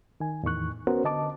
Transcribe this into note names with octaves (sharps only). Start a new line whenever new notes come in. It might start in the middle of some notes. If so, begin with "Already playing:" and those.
D#3 G#5
E2 A2 D#3 C#6 F#6
B3 C#4 F#4 A#4 C5
D3 D#5 A5 D6